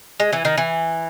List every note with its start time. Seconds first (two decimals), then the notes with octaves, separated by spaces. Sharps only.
0.20 G#3
0.33 E3
0.45 D#3
0.57 E3